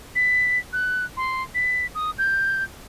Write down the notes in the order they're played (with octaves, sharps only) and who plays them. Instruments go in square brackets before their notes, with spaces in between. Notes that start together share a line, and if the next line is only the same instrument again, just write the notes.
[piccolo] B6
F#6
C6
B6
D#6
G6